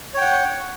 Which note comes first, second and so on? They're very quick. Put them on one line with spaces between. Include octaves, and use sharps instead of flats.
C#5 G5 F#5